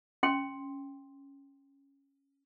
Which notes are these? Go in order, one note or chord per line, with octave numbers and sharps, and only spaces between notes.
C#4 G5 C6